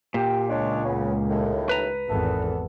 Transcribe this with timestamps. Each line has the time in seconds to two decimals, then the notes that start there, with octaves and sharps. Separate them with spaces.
0.14 A#2 G4
0.50 C#2 G#3 D4 C#5
0.85 C#3 B3
1.30 D#2 A2
1.69 B4 A#5
2.09 G#1 E2 E3 B3 A4